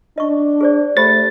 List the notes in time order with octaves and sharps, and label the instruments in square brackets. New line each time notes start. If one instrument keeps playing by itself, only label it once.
[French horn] D4 [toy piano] D#5 C#6
[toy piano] G#4 C5 D5
[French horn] A3 [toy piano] G4 C5 B5 [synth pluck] A6